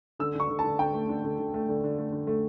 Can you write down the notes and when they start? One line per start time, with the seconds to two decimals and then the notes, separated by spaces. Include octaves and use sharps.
0.19 D3 E6
0.35 D3 C#6
0.50 D3
0.59 A5
0.64 D3
0.79 D3 G5
0.94 A3
1.09 D3
1.24 D3
1.39 D3
1.54 A3
1.69 D3
1.84 D3
1.98 A3
2.12 D3
2.27 A3